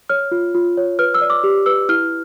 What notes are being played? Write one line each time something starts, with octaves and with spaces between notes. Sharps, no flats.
C#5 F6
F4
F4
C#5
B4 F6
E6
D5
D6
G4
B4 E6
E4 F6